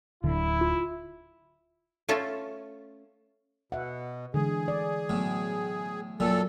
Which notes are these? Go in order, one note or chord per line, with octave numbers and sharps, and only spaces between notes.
D1 D3 E4
F4
A3 C#4 F4 A4
B2 E5 F#5
D3 E3 G#3 G#4
D5
A2 F#3 B3
F#2 A#2 F#3 A4